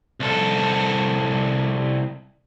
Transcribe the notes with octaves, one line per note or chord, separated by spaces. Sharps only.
C2 A4